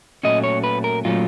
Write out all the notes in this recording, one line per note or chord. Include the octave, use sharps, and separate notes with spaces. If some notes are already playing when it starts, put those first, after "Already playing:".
A#2 F#3 A3 C#4 D#5
C#5
B4
A#4
A#2 F#3 A3 C#4 F4